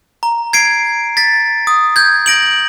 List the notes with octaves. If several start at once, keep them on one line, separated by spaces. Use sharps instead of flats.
A#5
G#6 C7 D7
A6 B6
D#6
G6 G#6
A#6 D7 F#7